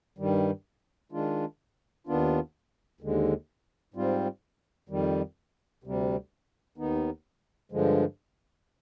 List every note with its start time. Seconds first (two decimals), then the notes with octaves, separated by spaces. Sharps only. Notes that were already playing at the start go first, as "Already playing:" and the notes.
0.18 G2 D#3 G3
1.12 D#3 G#3 D4 F4
2.07 D#2 D#3 B3 D4 F4
3.01 D#2 D3 G#3
3.94 G#2 G3 C4 F4
4.89 F2 D#3 G3
5.84 D2 C3 G3
6.78 D#2 D#3 B3 D#4
7.72 G2 D3 F3 G#3